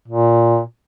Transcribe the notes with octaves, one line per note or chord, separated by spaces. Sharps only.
A#2